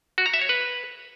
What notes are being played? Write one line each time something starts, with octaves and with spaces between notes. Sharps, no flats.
F#4
A#5
E5
C#5
B4